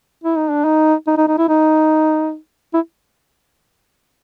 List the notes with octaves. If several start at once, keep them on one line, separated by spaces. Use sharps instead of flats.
E4
D#4
D4
D#4
D#4
D#4
D#4
E4
D#4
E4